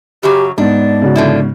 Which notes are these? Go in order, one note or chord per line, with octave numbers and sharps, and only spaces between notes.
F#2 C#3 F#3 G4
G#2 B3 D4 D5
C#3 F#4
D3 F3 E4